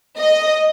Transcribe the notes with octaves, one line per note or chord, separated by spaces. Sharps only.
D#5